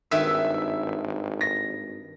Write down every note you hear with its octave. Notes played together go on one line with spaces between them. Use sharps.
G#1 G2 D#3 B4 E5 E6
A#6